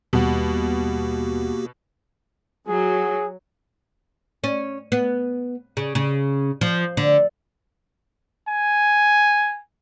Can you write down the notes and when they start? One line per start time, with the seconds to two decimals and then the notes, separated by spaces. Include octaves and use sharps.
0.13 D#2 B2 G3 A#3 F#4 G4 F#5
2.68 F#3 G#4
4.44 C#4
4.92 B3
5.77 C#3
5.95 C#3
6.61 F3
6.97 D3
8.48 G#5